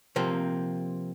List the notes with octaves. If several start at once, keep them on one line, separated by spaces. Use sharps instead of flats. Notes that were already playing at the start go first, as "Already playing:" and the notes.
C3 F3 A#3 C4